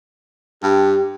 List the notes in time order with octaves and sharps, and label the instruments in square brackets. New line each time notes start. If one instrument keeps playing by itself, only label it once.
[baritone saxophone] G2 [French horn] G4